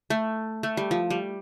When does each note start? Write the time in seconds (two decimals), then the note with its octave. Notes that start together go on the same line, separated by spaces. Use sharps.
0.10 A3
0.63 A3
0.77 G3
0.91 F3
1.10 G3